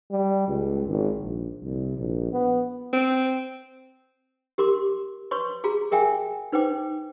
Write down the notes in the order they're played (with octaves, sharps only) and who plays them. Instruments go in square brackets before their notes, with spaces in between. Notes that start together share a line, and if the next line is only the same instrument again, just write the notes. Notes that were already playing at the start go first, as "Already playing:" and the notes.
[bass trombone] G3
C#2
G#1
A#1
C2
A#1
B3
[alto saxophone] C4
[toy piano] G4 A#4 C6 D6
B4 C#5 C6 C#6
F#4 G#4 A#5
G#4 A#4 E5 G5 G#5
D#4 B4 C5 G5 D6